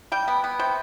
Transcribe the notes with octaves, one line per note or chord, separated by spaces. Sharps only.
G3 G5
B3
B3
C3 G5